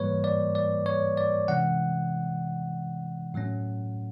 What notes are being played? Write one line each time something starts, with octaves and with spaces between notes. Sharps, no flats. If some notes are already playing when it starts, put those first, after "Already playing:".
Already playing: G#2 E3 G3 A#3 B4 C#5
D5
D5
C#5
D5
C3 E3 G#3 C#4 F#5
A2 F#3 A3 C#4